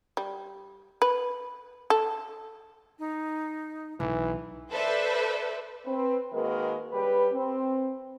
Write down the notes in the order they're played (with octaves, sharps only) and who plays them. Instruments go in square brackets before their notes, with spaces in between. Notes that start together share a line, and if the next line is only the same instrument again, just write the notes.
[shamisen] G3
B4
A4
[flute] D#4
[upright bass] B1 [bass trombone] E3
[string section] A4 B4 C5 D5 E5
[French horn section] C4 B4
D#3 G#3 A#3 F#4 A#4 B4
C#3 G3 G4 B4
C4